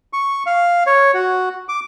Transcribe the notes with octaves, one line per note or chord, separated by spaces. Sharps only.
C#6
F5
C#5
F#4
D6